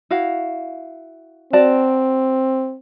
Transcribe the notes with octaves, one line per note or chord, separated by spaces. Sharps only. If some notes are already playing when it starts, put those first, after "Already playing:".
E4 F#4 F5
C4 F#4 D5 A5